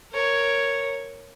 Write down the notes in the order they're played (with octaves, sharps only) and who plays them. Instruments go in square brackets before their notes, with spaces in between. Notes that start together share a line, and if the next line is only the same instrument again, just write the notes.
[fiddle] A#4 C#5